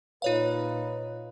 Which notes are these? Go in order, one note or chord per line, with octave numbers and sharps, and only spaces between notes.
A#2 D#4 F4 B4 C#5 F5